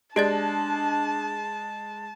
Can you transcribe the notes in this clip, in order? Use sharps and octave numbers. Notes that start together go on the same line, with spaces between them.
G#3 D4 G4 D5 A5 A6